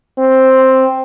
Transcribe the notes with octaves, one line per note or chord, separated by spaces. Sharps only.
C4